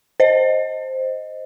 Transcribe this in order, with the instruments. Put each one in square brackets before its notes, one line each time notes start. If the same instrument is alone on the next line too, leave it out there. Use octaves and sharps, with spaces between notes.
[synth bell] C5 D#5